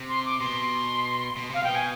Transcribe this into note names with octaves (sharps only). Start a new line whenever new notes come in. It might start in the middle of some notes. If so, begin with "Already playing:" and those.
Already playing: C3
C6
D6
B2 C6
B2
C3 F5
B2 G5
G#5